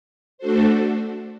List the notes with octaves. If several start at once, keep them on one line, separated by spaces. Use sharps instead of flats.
A3 D4 F#4 A4 C5